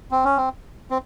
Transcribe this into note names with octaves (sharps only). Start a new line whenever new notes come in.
C4
C#4
C4
C4